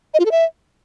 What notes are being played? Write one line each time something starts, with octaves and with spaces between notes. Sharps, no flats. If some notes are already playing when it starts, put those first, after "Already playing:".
D#5
F4
A4
E5